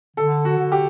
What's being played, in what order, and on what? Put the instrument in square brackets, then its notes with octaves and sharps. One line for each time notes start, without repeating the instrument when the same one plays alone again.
[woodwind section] D3 [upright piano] A4
[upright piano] F#4
[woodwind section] D3
[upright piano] G4